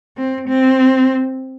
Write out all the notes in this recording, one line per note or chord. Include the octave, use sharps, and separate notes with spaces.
C4
C4